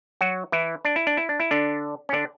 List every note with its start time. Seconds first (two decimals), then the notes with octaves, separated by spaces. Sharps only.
0.21 F#3 F#4
0.52 E3 E4
0.85 D4
0.96 E4
1.07 D4
1.17 E4
1.29 D4
1.40 E4
1.51 D3 D4
2.09 C#4
2.13 D3 D4